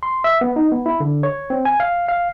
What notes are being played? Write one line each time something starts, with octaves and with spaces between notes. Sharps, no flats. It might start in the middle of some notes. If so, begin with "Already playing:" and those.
C6
E5
B3
D#4
B3
E4
D3
C#5
C4
G#5
F5
F5